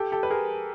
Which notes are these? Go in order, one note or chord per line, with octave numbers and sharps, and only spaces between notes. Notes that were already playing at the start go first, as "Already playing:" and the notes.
Already playing: G4 A4
G4 A4
B4
G#4 A#4